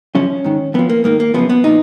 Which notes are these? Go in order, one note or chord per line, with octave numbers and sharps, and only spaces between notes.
F#2 C#3 F3 C#4
G#2 D#3
F2 F3 B3
A#3
G#2 D#3 A#3
A#3
F#2 C#3 F3 B3
B3
A#2 F3 D#4